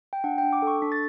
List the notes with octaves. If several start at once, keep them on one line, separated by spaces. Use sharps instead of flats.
G5
D4 F#5
D4 G5
D6
A4 C#6
D4 B6
A6